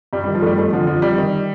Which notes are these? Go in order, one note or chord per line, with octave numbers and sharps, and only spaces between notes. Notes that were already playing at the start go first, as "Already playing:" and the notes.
G2 G3
G3
D#3
F3
G2 G3 A3
F2 A3
D3 F3
F2 F3
F2 G3
D#3